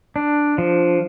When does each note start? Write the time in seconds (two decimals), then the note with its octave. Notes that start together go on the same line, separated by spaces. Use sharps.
0.16 D4
0.58 F3